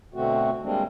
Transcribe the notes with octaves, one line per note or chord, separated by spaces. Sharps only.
B2 D3 A3 C4 F#4
G3 G#3 A#3 C4 D4